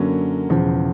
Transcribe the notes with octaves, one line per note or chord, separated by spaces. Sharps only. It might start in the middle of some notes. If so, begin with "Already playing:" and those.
Already playing: F#2 D3 F#3 A#3 C#4
E1 E2 C#3 F3